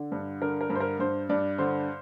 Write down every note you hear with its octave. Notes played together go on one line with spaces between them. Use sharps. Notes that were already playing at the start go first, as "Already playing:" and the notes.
Already playing: D3
G2
D3 A#4
A#4
G2
C5
A#4
G2 C5
G2 D5
D3 C5